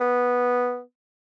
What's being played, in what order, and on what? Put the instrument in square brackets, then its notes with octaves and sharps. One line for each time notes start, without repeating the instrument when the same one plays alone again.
[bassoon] B3